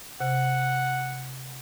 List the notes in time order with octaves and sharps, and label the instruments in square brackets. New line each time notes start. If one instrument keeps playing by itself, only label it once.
[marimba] C3 [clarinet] F#5